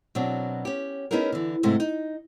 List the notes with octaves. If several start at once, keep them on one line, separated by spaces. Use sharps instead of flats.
B2 F#3 C4 D4
C#4 G4
B3 C#4 D#4 E4 G#4 A#4
D3 E3
G#2 C3 G#3 A3
D#4